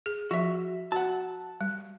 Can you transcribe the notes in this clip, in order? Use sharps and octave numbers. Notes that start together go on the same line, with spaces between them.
G#4
F3 F#4 E5
F#4 F#5 A5
G3